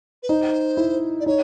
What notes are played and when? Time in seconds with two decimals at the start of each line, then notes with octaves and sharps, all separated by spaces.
0.22 B4
0.29 D#4 C5
0.77 E4
1.20 D5
1.26 D#4 C#5